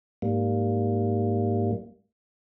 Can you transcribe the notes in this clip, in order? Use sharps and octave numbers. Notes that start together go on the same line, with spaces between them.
G#2 G3 A#3